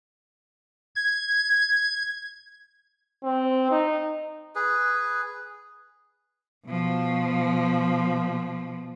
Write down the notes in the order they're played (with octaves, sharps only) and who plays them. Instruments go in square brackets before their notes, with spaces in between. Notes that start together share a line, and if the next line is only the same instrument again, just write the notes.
[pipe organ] G#6
[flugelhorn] C4
D#4
[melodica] G#4 B4
[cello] B2 F3